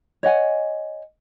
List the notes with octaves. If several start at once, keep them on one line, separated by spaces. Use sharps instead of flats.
C#5 D#5 F#5 G#5